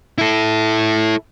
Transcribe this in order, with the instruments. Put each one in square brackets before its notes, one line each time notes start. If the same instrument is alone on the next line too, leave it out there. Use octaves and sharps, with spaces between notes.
[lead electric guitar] E4 A4